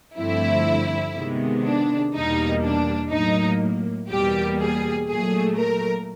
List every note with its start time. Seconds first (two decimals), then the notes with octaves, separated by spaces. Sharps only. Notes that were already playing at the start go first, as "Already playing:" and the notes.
0.17 G2 D3 F3 A3 C4 E4
1.15 C3 D#3 G#3 B3
1.65 D4
2.13 E2 B2 G3 A#3 D#4
2.62 D4
3.11 A2 F#3 A#3 D#4
4.10 E2 B2 G3 A#3 G4
4.58 G#4
5.07 A#2 F#3 A3 G#4
5.56 A#4